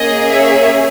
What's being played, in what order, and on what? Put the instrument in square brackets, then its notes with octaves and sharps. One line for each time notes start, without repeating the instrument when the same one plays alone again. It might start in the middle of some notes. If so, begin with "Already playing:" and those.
Already playing: [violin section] A#3 C#4 G#4 D#5
C#5 E5